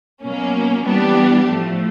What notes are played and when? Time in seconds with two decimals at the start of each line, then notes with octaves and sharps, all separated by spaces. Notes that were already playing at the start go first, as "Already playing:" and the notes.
0.23 B2 F#3 A#3 C#4
0.85 E3 G3 B3 D4 G4
1.47 A2 F3 A3